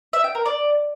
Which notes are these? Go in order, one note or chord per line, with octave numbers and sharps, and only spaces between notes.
E5
G5
A#4
D5